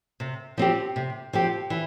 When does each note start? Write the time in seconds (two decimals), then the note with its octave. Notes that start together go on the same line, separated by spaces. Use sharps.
0.20 C3
0.58 F3 C4 G4
0.96 C3
1.33 F3 C4 G4
1.70 E3